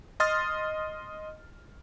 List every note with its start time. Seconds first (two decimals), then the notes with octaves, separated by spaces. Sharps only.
0.20 D#5 C6 D#6 F6 A6